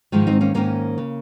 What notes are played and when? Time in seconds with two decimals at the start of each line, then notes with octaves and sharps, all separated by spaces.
0.12 G#2 D#3 F3 G#3
0.27 C4 D#4
0.41 A#3 C#4
0.54 G#2 D#3 A#3 C#4
0.98 C#3